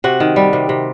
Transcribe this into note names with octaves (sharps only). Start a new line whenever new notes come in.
C3 F#4
D#3
G3
C3
C3